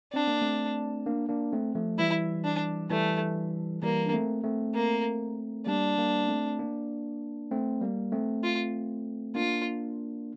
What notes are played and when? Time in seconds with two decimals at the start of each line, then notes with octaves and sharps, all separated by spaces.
0.13 C4 D4
0.27 A#3
0.41 A3 C4
1.06 A#3 D4
1.29 A#3 D4
1.52 A3 C4
1.75 F3 A3
1.98 E3 G3 E4
2.44 D4
2.91 E3 G3 A3
3.82 E3 G3 A#3
4.06 D4
4.13 A3 C4
4.44 A3 C4
4.75 A#3
5.66 G3 A#3 D4
5.98 G3 A#3
6.28 A3 C4
6.59 A#3 D4
7.51 A3 C4
7.81 G3 A#3
8.12 A3 C4
8.44 F4
9.35 A#3 D4 F4